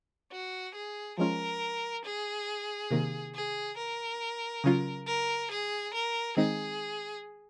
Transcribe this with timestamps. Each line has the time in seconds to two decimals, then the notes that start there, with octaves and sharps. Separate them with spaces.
0.32 F#4
0.75 G#4
1.18 F3 G#3 C#4 F4 A#4
2.05 G#4
2.91 C3 D#3 A#3
3.35 G#4
3.78 A#4
4.64 C#3 F#3 C#4 F4
5.07 A#4
5.51 G#4
5.94 A#4
6.37 D#3 G#3 C4 D#4 G#4